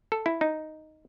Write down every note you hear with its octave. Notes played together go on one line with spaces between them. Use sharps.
A4
E4
D#4